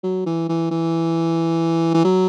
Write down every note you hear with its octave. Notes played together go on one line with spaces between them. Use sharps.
F#3
E3
E3
E3
E3
F#3